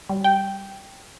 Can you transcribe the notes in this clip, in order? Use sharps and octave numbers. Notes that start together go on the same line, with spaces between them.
G3
G5